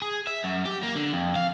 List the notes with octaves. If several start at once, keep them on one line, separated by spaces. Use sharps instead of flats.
G#4
E5
F#2
G4
A#3
D3
F2
F5